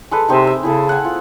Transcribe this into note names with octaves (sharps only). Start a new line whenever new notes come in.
G#3 A4 B4
C3 C4 D#4 G#5
E5
C#3 E4 G#4 A4
F#5 G#5
F4